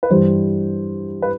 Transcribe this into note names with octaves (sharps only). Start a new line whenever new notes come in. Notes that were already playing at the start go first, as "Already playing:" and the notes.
B4
G2 E3 G3 C5
B4